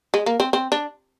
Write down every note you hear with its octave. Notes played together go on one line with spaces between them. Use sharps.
G#3
A#3
C4
C4
D4